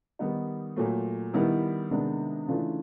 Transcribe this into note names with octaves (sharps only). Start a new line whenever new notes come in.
D#3 G3 B3 D#4
A#2 F#3 A3
D#3 G3 B3 E4
C3 D#3 G#3 B3 D4
C#3 E3 A3 D4 F4